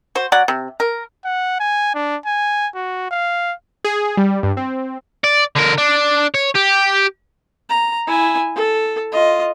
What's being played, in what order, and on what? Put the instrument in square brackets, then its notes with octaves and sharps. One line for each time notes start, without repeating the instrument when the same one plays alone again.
[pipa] F#4 C5
F#3 D5 F#5
C3
A#4
[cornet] F#5
G#5
D4
G#5
F#4
F5
[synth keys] G#4
G3
G2
C4
[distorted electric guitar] D5
D3 A#4
D4
C#5
G4
[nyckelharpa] A#5
E4 G#5
A4
F4 D#5